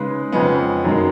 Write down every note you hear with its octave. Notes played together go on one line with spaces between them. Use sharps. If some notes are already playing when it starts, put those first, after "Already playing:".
Already playing: C#3 G#3 D#4 G#4 B4
F2 C#3 G#3 B3
F#2 D#3 G#3